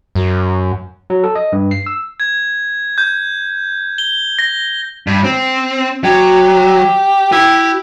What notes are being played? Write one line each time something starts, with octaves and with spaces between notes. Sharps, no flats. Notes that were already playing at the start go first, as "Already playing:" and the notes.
F#2
F#3
A4
D#5
G2
C7
E6
G#6
G6
G7
A#6
G2
C4
F#3 G4
E4 G4 G5